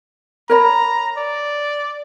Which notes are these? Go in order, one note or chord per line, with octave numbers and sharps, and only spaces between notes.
A#4 C#5 A#5 B5
D5